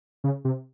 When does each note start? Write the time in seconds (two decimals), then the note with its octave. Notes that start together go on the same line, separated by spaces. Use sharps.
0.24 C#3
0.45 C3